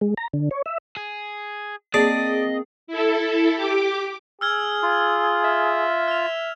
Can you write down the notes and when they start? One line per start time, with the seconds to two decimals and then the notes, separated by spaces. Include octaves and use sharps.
0.01 G#3
0.17 A#5
0.33 D3
0.51 C#5
0.66 E5
0.97 G#4
1.94 A#3 C4 G#4 D5 D#5 A5
2.87 E4 A4
3.53 G4 D6
4.41 G#4 E6 F6 G#6
4.83 F4
5.45 E5
6.08 F6 F7